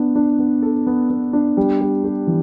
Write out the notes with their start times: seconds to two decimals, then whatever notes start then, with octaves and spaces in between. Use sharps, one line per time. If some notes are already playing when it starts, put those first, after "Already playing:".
Already playing: B3 D4
0.15 D4
0.39 B3
0.62 A4
0.87 B3
1.10 B3
1.33 D4
1.57 G3
1.81 G3
2.04 G4
2.27 E3